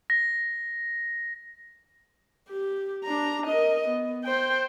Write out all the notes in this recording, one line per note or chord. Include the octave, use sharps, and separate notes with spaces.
A#6
G4
D4 A#5
A#4 D#5
B3
C5 G5